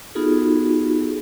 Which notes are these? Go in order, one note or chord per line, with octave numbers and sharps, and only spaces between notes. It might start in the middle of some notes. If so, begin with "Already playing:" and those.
B3 D#4 F4 F#4 G#4 A4